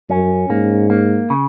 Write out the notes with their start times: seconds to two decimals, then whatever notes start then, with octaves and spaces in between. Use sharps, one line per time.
0.09 F#2 C#4
0.50 G#2 A#3
0.90 A#3
1.30 C#3